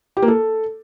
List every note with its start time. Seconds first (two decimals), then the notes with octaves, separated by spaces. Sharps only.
0.17 G4
0.22 A#3
0.28 A4